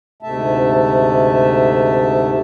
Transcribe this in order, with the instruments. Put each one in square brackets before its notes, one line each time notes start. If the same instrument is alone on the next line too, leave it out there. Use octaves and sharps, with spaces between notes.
[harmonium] D2 G#2 C3 A3 E5 A5